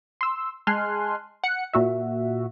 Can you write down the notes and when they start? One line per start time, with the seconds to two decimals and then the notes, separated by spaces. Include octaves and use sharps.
0.21 C6 E6
0.67 G#3 G#5 A5 C6 F6 F#6
1.44 F#5 C#7
1.73 A#2 F#4 E5